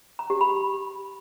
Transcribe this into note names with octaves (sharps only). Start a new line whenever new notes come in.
A#5
G4
B5